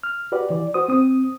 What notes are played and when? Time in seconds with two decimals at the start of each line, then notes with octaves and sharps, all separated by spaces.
0.03 F6
0.32 F#4 G4 B4 D5
0.50 E3 D5
0.74 F#4 C5 D#6
0.89 C4 D#6